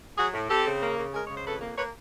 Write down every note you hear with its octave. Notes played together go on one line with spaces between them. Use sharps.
F#3 F#4 G#4
A2
C4 G4 A4
C#3
A#3
C#3
G#3 G#4 A#4
C#3 C#5
C5
F2 A4 B4
A#3
A#3 B4 C#5